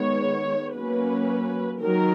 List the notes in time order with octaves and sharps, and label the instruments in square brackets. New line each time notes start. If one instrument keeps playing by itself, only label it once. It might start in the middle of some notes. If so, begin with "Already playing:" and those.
Already playing: [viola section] D#3 G#3 B3 C#5
F#3 A#3 C#4 B4
D#3 F#3 A#4